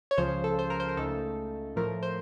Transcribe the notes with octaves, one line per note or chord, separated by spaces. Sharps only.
C#5
C#2 C#3 F3 C5
A4
C5
A#4
C5
A#4
C#2 C#3 A3 D#4 A4
A2 F3 A3 A#4
C5